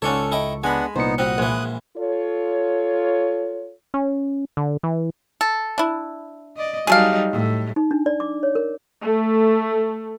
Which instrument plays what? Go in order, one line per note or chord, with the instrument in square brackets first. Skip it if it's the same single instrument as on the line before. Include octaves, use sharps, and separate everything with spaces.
[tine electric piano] C#2 C#6 [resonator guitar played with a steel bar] G#2 A4 [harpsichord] C#4 D4 C#5
[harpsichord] E4 D#5 G5
[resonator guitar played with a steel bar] G#3 [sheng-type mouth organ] B3 D4 F#5 [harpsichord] G#5 B5
[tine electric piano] C2 A#2 C#7 [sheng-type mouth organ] B3 D#4 [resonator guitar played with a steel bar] C5
[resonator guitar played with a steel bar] G3 F#4 [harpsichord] C4 [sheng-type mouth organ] D#6 F#6
[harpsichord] A#1 E3 [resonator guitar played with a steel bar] G#3
[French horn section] F4 A4 C#5
[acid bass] C#4
D3
E3
[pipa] A4
D4 E4
[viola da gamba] D5 D#5
[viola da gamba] F#3 G3 D#4 [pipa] G#4 A4 F5
[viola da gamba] A2
[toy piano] D#4
D4
D5
D6
C#5
A#4
[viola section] A3